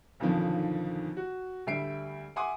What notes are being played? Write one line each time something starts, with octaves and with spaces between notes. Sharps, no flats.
B1 F2 D3 D#3 F3
F#4
D2 G3 E5 C7 D7
E5 F#5 G#5 C6 D6 D#6